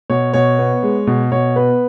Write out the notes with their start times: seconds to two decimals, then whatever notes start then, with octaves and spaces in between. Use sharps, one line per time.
0.10 B2 C#5
0.33 B2 C#5
0.59 B3
0.83 G#3
1.07 B2
1.32 B2 C#5
1.56 B3 B4